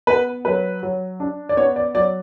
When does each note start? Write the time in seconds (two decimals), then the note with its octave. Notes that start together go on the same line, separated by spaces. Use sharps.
0.07 B3 B4
0.45 F#3 B4
0.83 F#3
1.20 D4
1.49 D5
1.57 B3 C#5
1.76 D5
1.95 F#3 D5